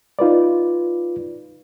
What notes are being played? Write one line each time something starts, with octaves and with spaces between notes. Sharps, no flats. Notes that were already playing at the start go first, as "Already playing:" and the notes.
D#4 F4 B4 D5